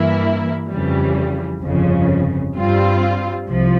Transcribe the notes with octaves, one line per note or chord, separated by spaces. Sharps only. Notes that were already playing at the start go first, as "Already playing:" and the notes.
Already playing: G2 E3 A#3 E4
F2 C#3 E3 G3
G1 F2 C#3
G2 G3 C4 F4
C2 C3 F3